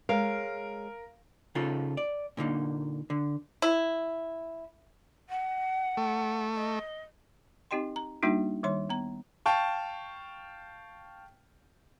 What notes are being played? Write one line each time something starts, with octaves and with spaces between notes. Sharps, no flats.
G#3 A#4 C#5 F5
C#3 D#4 F4 A4
D5
A#2 D3 A#3 D#4
D3
E4
F#5
A3
D#5
C4 D#4 G4 D#5 G5 C6
A#5
G3 A#3 D4 D#4 F#4
D#3 G3 C#5 C6
B3 A#5
F5 G5 A5 C#6